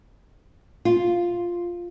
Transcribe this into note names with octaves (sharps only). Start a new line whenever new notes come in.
F4